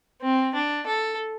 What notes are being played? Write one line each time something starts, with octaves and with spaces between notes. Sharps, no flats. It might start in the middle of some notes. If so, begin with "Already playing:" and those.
C4
D4
A4